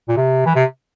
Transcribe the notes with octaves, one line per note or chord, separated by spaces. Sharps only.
A#2
C3
E3
C3